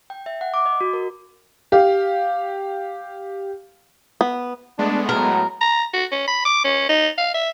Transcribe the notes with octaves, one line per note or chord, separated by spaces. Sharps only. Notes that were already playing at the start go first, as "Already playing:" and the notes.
G5
E5
F#5
D6
D#5
F#4
A#4
G4 F5
B3
G#3 A3 B3 D4
A2 F#3 A#4
A#5
F#4
C#4
B5
D6
C#4
D#4
F5
E5